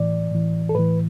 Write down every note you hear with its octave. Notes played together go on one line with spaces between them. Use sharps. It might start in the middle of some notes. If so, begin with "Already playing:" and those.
Already playing: A2 E3 D5
A2 E3
A4
A2 E3 B4